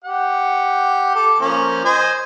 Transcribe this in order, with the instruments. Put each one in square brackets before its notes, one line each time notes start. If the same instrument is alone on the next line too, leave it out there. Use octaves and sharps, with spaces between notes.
[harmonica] G4 F#5
A4 D6
F3 A#3 C#4
C5 D#5 G#5